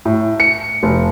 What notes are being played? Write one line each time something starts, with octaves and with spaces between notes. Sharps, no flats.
A2
C#7
F1